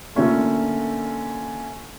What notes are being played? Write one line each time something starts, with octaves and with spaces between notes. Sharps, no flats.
D3 A3 A#3 C#4 F4